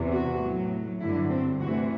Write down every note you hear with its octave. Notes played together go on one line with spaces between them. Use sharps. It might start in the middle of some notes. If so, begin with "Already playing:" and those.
Already playing: E2 C3 E3
F#4
A2 F#3
G2 D3 F#3 E4
C4
D2 C3 E3 F#4